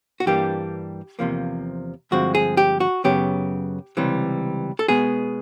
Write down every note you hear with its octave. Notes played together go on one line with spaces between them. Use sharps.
F#4
G2 E3 G3 A#3 D4 G4
E2 C3 F3 A#3
G2 D3 F3 G#3 C4 F#4
G#4
G4
F#4
F#2 C#3 F#3 B3 G4
C#2 C3 E3 G3
A4
B2 G#3 B3 G#4